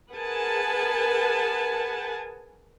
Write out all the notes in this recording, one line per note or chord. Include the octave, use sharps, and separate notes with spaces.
G#4 A#4 B4 F#5 G#5 A5